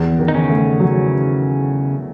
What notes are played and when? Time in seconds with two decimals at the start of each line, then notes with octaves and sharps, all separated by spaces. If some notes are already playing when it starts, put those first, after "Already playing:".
Already playing: E2
0.19 D#3
0.28 D#4
0.34 C#3 C#4
0.50 A3
0.80 F#3